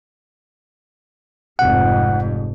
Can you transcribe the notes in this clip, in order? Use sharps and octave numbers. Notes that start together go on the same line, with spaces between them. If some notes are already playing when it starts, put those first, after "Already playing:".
F1 F2 G#2 F#5